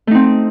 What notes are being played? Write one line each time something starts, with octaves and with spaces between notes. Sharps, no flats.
A3 C4 D#4